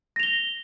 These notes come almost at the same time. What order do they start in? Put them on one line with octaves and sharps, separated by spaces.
A#6 F7 G7